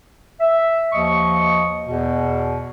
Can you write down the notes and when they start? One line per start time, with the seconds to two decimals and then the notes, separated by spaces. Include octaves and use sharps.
0.40 E5
0.92 D#2 F3 D#5 C#6
1.87 E2 B2